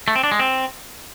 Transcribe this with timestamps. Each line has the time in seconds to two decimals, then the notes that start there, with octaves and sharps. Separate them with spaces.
0.08 A3
0.16 C4
0.24 D4
0.31 G#3
0.39 C4